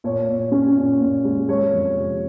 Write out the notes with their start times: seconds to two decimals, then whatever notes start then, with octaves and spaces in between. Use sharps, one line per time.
0.04 A#2 C#5
0.29 A#2
0.52 C#4
0.77 A#2
1.01 A#2
1.24 G#3
1.48 G#3 C#5
1.73 F2
1.96 C3